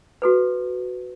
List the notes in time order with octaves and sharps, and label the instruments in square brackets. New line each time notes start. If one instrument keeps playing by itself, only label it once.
[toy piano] F#4 A4 B4